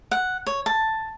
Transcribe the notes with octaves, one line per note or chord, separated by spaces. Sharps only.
F#5
C#5
A5